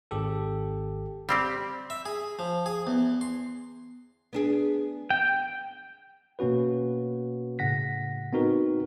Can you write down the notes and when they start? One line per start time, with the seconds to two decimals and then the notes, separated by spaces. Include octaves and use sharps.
0.11 G#1 G4 A4
1.29 G3 C4 G4
1.90 E5
2.06 G#4
2.39 F3
2.66 G#4
2.87 E2
3.21 C6
4.33 B3 D4 G#4
5.10 G5
6.39 B2 A#3 C#4 F#4 B4
7.59 A2 C#3 F#5 A#6 B6
8.33 B3 C4 D#4 F#4 A#4 B4